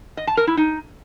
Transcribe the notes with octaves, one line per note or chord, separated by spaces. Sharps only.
D#5
A5
A#4
E4
D#4